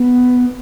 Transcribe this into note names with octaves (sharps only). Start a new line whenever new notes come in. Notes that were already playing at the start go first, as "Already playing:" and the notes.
Already playing: B3